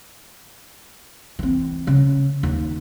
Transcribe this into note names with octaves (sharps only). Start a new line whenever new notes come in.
E3 C4
C#3
D#2